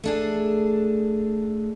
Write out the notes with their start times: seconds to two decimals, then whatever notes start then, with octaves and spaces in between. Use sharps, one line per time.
0.04 A3 D4 G#4